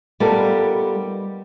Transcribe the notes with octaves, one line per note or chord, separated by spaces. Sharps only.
G3 B3 D#4 F4 A4 A#4